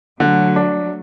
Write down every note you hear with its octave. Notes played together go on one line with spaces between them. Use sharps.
D3 F#3 A3
D4